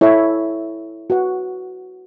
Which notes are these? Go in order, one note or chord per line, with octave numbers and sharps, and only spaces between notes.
E4 A4 C#5 E5
F#4 B4 F#5